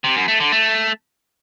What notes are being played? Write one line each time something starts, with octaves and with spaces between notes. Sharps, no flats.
C3
F#2
A3
D3
A3